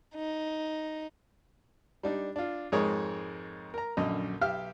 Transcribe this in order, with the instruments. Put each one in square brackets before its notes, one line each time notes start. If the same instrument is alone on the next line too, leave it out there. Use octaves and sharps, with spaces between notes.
[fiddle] D#4
[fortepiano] G3 D4 D#4
D4 F4
F2 G#2 G#3 G#4 A#4 C#5
A#4 A#5
A#1 F#2 D3 D#5
B1 G4 E5 F5 F6